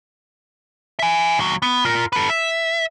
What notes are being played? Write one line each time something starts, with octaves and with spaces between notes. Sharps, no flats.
E5 G#5
D#2 F#3
B3
F4 A#4
A4 B4
E5